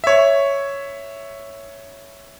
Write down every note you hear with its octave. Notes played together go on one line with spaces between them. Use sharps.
C#5 E5